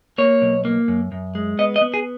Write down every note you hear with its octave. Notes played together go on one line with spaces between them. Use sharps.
A#3 C#5
B1
A#3
F#2
F#2
G#3
B3 D#5
D#5
B3
G#4